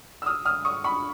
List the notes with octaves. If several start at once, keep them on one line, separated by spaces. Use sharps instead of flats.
E6
D#6 F6
D#6 F6
C#6 D#6
B5 C#6